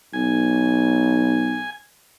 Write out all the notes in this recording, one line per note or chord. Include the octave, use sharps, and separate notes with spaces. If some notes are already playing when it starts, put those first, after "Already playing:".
B1 G#5